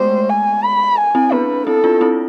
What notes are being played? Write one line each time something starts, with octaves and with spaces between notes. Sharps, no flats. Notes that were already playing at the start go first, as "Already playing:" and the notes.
Already playing: G#3 A3 B3 C5
G#5
B5
G#5
C4 E4
B3 D4 B4
C4 E4 A4
D4 F4
C4 E4